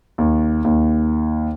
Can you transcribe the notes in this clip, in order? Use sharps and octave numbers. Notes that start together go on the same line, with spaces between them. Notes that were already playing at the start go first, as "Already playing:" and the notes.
D#2
D#2